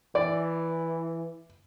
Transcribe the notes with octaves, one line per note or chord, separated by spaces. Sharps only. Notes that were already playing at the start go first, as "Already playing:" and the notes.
E3 D5